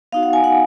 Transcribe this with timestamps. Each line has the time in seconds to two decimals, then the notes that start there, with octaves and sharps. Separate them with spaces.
0.12 B3 D#4 F#4 F5
0.23 F#5
0.33 G#5
0.44 F#5